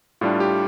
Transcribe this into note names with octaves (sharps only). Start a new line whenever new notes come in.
A2 G3 D4 F4
G4